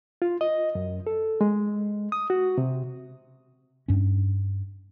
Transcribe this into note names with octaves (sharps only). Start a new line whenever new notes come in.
F4
D#5
F#2
A4
G#3
D#6
F#4
C3
G2 C#4